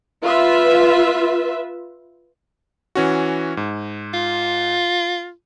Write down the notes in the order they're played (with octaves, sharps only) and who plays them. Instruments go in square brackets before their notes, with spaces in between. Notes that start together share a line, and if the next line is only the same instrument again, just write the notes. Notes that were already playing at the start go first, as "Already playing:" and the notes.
[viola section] F4 B4 E5
[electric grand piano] E3 C#4 F#4
G#2
[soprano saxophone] F4